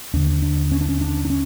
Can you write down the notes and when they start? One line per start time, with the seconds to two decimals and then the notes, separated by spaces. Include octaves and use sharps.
0.13 D#2 D3 D4
0.42 D4
0.72 C#4
0.81 D4
0.89 C#4
1.01 D4
1.25 D4
1.30 C#4